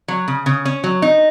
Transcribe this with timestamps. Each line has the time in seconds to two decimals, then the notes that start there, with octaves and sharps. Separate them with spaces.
0.08 F#3
0.28 C#3
0.46 C#3
0.65 C#4
0.84 F#3
1.02 D#4